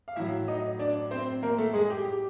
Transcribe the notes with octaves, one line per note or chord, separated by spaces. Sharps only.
F5
A2 F#3 E4 E5
D#4 D#5
D4 D5
C4 C5
A#3 A#4
A3 A4
G#3 G#4
G4
G4